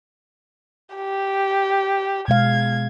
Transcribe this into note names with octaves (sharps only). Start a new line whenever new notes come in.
G4
B2 G#3 F5 G#6